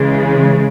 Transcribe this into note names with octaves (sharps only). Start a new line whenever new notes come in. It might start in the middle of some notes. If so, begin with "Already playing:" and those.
Already playing: C#3 E3 G#3